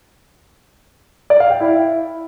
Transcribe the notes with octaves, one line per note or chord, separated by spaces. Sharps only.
D5
F5
G5
E4